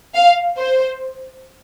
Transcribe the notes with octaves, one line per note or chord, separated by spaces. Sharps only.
F5
C5